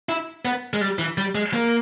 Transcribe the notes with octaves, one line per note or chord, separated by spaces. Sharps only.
E4
B3
G#3
G3
E3
G3
G#3
A#3